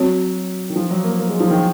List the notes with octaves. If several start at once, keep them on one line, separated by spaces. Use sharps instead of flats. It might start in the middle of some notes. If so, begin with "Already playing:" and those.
Already playing: F#3 C4 F#4 C#5
D#3
F3
F#3
A#3
A#3
G#3
F3
D#3